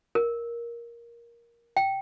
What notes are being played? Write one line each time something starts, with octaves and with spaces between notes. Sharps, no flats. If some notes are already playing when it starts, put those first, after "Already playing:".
A#4
G5